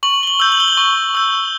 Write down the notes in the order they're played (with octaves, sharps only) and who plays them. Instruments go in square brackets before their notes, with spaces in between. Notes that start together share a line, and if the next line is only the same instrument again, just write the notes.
[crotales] C#6 F#7
G7
F#7
E6 G6
F#7
G7
F#7
C#6
E6 G6